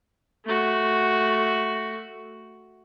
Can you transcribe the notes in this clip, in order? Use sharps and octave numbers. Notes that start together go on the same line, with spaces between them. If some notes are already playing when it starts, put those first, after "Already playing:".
A3 F#4